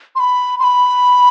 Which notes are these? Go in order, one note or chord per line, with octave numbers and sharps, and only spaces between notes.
C6
B5
C6
B5